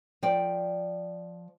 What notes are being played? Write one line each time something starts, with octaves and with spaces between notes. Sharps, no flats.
F3 D5 G5